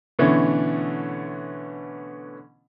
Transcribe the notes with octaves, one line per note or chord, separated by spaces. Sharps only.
B2 D3 E3 A3 C#4